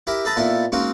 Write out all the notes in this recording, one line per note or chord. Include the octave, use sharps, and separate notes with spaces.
E4 G4 A#4 E5
G#4 A4 B4 E5 A5 A#5
A#2 B3 D#4 E4 A4
G#3 A#3 C4 C#4 D#4 F#4